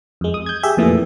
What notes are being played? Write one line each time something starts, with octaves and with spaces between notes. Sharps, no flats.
F2 G#3
D#6
G6 G#6
G4 G#4 E5
F2 A#2 E3 A3